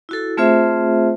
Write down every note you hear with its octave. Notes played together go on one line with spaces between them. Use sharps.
E4 F#4 A4
A3 C4 F4 G#4 C5 E5